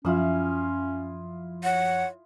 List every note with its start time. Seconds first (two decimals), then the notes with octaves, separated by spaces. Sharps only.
0.05 F#2 F3 C#4 E4 F4 D#6
1.64 C#5 F#5